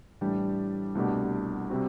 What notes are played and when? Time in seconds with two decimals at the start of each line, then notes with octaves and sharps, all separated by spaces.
0.21 A2 E3 G3 D4 G4
0.95 C2 B2 A3 D4 G4
1.70 C3 G3 C4 F#4